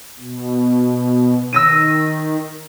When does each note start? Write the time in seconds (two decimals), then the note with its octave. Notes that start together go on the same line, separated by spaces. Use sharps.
0.19 B2
1.53 D#3 E6 A#6 D#7